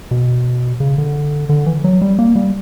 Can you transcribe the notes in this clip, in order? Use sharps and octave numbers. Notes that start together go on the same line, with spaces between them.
B2
C#3
D3
D3
E3
F#3
G3
A#3
G3